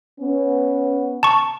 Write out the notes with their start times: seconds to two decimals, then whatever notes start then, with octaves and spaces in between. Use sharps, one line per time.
0.20 B3 C#4
1.23 A5 C#6